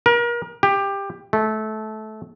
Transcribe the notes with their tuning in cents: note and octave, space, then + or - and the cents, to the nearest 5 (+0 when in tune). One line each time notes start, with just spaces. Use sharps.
A#4 +35
G4 +15
A3 -20